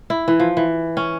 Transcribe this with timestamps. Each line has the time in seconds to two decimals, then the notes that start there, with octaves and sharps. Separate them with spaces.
0.10 E4
0.28 E3
0.40 F3
0.57 E3
0.97 C#4